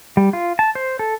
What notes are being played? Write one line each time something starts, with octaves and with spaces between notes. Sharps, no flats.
G3
F4
A5
C5
A4